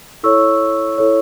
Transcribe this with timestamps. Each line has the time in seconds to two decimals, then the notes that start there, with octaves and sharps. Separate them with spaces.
0.23 E4 A4 C#5 C#6 E6
0.98 E4 A4 C#5